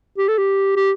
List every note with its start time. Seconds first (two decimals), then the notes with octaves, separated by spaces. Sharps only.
0.18 G4
0.28 A4
0.38 G4
0.76 G4